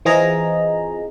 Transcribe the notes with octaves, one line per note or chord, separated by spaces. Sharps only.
E3 C4 F4 G#4 D#5 A#5